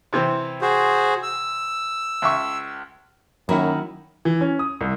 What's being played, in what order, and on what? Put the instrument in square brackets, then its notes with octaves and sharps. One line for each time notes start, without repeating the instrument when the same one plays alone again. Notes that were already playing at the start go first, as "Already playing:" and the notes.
[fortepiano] C3 E3 C4
[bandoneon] F#4 G#4 C5
E6
[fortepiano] C#2 E5 C#6
[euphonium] F#2 [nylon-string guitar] D#3 [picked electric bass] F#3 [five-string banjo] A#3 E4 F#5
[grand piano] E3
C#4
D#6
C2